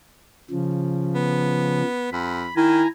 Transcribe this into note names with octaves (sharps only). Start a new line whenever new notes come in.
C#3 F3
B3
F2 B5
D#3 E4 G#5 A#5